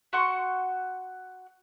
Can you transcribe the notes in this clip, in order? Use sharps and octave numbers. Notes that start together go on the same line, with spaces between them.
F#4 F#5 C6 C#6